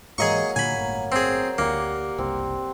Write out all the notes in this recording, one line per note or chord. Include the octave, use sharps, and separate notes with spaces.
G#2 E3 F#3 A#3 G#4 D#5 C#6
A#2 D3 G#5 B5
G1 A2
C4 G#4
D2 A#3 G4 D5 F#5
F#1 C2 C4